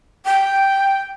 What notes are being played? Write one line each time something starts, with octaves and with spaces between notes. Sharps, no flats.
G5